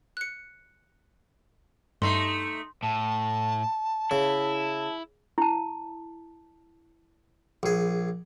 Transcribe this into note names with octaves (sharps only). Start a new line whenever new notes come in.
F#6 C#7
G2 A3 D#4 C6 C7
A2 A5
C#3 E4
E4 A5
A#1 G#4